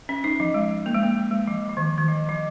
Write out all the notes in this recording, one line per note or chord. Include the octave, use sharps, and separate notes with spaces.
C#4
D#4
F3
G#3
A#3
G#3
A#3
G#3
G#3
F3
F3
D#3
D#3
F3
F3